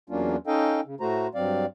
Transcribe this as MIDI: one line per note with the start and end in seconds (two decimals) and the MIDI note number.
0.10 0.36 40
0.10 0.36 54
0.10 0.36 58
0.10 0.36 61
0.10 0.36 62
0.10 0.36 65
0.47 0.80 61
0.47 0.80 63
0.47 0.80 69
0.47 0.80 75
0.47 0.80 77
0.47 0.80 79
0.86 0.95 49
1.00 1.27 45
1.00 1.27 57
1.00 1.27 66
1.00 1.27 72
1.00 1.27 82
1.35 1.66 43
1.35 1.66 54
1.35 1.66 60
1.35 1.66 74
1.35 1.66 77